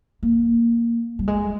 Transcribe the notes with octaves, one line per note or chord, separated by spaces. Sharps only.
A#3
G3
G#3